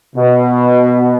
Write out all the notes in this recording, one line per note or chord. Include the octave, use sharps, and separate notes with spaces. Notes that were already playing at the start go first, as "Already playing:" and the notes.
B2